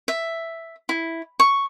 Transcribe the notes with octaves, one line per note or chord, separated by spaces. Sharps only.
E5
E4
C#6